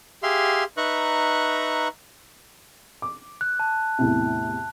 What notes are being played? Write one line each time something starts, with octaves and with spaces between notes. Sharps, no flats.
G4 G#4 E5 F5 C6
D#4 B4 E5 A#5 C#6 F#6
D6
F#6
A5
E2 A2 C3